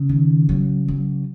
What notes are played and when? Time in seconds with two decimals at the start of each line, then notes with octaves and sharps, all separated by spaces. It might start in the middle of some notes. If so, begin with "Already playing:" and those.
Already playing: C#3
0.09 D#3
0.49 F#3
0.88 F#3